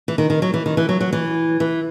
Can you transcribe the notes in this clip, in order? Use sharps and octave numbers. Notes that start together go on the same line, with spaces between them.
E3
D#3
D#3
F#3
E3
D#3
E3
F#3
F#3
E3
E3